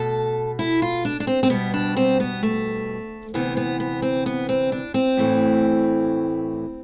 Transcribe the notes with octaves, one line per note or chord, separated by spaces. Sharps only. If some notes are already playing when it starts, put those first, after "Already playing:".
Already playing: B2 A3 A4
E4
F4
D4
D4
C4
C4
B2 G3 B3
D4
C4
B3
A3
D2 C3 E3 B3
B3
B3
C4
B3
C4
D4
C4
A2 E3 A3